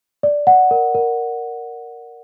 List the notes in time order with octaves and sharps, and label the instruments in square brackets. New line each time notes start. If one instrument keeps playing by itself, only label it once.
[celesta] D5
F#5
A#4
A#4